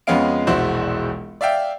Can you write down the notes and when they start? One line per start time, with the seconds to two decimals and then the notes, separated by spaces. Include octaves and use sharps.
0.07 F2 G#3 B3 C#4 F5 D7
0.47 E1 A#1 E4 F#4 C5
1.41 D5 E5 F5 G5